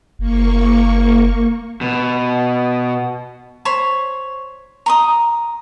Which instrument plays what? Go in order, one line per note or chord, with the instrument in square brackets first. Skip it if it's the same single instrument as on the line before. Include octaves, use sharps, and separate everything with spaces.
[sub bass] F#1 [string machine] A#3 C#6
[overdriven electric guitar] B2
[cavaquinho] C5 C#5 B5
A#5 C6 D#6